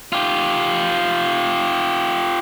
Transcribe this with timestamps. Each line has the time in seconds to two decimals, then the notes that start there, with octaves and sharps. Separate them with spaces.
0.13 F4 G4